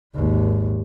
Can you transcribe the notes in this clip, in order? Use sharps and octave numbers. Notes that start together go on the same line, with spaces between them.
G#1 D#2